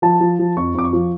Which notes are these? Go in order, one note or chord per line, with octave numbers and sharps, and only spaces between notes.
F3 A5
F3
F3
F2 C#6
F2 D6
C#6
F3